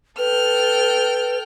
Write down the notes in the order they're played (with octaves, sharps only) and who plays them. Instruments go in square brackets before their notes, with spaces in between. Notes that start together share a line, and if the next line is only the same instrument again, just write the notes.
[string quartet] A4 G5 F6 [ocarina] B4